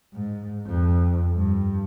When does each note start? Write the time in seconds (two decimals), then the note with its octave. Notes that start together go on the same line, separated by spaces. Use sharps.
0.14 G#2
0.66 F2
1.36 G2